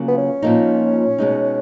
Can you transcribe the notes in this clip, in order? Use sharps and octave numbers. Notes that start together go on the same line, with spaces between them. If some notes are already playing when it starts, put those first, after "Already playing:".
Already playing: C#3 F#3 A#3 F4
B3
C#4
A#2 F3 A#3 D#4
B2 G#3 D#4